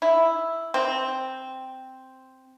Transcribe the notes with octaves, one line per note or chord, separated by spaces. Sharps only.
E4
C4